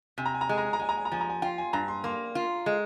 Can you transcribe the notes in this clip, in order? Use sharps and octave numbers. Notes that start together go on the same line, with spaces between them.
C3 G#5
A#5
G#5
A#5
G#3 G#5
A#5
G#5
A#5
G#3 G#5
A#5
G#5
A#5
F3 G#5
A#5
G#5
F4 G5
G#5
G2 A#5
C6
A#3 C6
F4
G#3